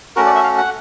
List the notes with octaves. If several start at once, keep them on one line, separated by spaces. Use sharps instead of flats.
A3 C#4 F#4 A#4
D5
E5
F5
F#5